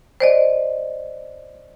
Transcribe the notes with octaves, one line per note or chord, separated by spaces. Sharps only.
C5 D5 D#5